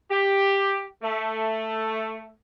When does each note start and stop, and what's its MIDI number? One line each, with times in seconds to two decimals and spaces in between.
0.10 0.83 67
1.03 2.31 57